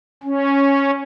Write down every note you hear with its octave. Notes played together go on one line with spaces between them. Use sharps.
C#4